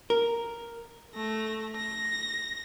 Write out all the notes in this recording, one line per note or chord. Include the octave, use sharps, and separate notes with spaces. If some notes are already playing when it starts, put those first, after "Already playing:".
A#4
A3 A#6
A#6